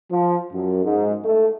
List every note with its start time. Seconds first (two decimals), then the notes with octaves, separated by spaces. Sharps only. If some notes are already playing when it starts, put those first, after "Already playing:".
0.10 F3
0.52 F#2
0.84 G#2
1.25 A3